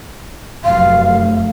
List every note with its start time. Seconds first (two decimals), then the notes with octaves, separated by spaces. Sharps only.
0.64 F1 F#2 A3 F5